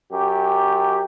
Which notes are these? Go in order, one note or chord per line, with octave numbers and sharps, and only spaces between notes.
F#2 G4